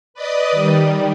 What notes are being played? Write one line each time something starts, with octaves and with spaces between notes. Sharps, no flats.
B4 D5 D#5 D#6
D#3 G3